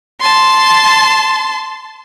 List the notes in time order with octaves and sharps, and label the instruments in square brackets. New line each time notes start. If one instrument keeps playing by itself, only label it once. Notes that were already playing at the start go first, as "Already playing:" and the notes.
[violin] A5 C6